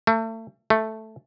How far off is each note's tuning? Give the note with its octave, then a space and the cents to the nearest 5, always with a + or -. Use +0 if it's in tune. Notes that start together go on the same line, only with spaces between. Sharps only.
A3 +35
A3 +0